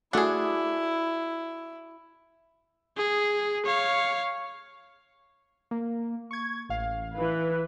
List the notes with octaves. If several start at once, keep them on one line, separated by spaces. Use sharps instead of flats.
A3 D4 E4 F#4 G#4 F#5
G#4
C#5 F5
A#3
C#6 G#6
A1 F5
E3 B4